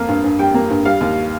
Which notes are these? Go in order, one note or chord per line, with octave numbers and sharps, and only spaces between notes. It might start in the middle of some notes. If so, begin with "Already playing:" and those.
Already playing: F2 A#3 F5
G2
G2
G3 G5
A#3
G2
G3 F5
D#2